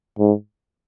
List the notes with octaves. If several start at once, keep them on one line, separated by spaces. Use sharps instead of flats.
G#2